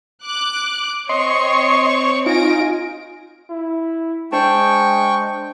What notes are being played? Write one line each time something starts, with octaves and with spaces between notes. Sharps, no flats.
D6 F#6
C4 C#5 D#5 C6 C#6
D#4 F4 G#5 A#6 D7
E4
G#3 D4 C5 G5 A5 C#6